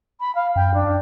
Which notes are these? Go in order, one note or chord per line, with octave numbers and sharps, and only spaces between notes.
B5
F5
F#2 G5
D4